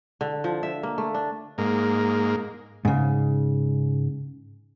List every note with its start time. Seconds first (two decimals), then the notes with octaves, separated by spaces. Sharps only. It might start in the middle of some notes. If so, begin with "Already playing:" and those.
0.21 D3
0.44 F3
0.63 E5
0.83 A#3
0.98 A3
1.14 D4
1.58 G#2 A#3
2.85 G#2 C#3